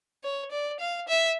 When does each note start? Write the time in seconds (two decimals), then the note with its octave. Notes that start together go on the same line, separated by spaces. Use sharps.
0.24 C#5
0.52 D5
0.80 F5
1.08 E5